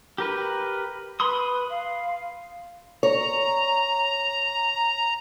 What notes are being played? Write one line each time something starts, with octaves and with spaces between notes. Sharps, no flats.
G4 A#4 B4
B4 B5 C6 D#6
F5
C#5 A#5